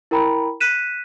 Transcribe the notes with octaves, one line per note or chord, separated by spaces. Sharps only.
E4 A#4 G5 A#5 B5
F#6 B6 D#7 E7